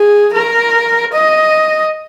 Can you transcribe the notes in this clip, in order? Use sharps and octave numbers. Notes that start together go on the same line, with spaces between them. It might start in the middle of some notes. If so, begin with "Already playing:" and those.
Already playing: G#4
A#4
D#5